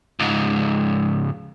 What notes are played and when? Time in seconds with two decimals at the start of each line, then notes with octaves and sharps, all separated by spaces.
0.19 C#2 G#2